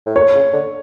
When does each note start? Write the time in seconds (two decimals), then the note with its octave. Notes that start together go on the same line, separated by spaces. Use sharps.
0.06 A2
0.16 A#2 C#5
0.35 C#3
0.53 D3